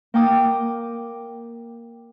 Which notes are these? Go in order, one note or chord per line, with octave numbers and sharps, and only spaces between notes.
A#3 G5 D6 D#6